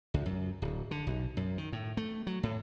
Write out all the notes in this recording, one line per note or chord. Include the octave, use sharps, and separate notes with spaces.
C#2
F#2
D1
D3
B1
F#2
D#3
A2
A3
F#3
A2